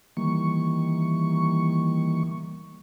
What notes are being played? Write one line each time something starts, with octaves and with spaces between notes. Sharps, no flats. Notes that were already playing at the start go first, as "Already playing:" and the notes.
D#3 E3 G3 A#3 C#6